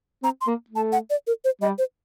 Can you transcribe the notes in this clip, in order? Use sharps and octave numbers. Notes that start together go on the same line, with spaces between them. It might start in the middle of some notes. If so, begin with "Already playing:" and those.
C4 A#5
C6
A#3
A3
A5
F#5
D5
A#4
C5
G3 D#5
C5